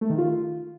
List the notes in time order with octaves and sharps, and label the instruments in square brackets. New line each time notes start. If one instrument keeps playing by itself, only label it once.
[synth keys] A3
D#3
F4